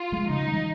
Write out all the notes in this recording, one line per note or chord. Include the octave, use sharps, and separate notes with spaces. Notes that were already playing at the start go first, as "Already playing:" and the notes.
Already playing: F4
F3 G#3
C#3 D#4
G3
E3